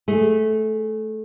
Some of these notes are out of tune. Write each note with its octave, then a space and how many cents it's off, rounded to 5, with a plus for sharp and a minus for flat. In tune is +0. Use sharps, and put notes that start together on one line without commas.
A3 -15 G#4 +0